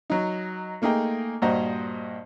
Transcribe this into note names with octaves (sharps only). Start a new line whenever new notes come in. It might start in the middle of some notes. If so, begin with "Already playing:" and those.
F#3 D#4
A3 A#3 D#4 G#4 G5
G2 A#2 F#4 C5 D#5 A#5